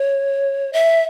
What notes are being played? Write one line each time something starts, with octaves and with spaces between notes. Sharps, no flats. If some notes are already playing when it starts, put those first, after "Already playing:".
Already playing: C#5
E5